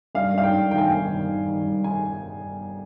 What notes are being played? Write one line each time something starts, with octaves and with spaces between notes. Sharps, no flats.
G2 F5
G2 F5
G5
G2
D#3 G5
G#5
G1 G5
D#3
D#3
D#3
G2
G#5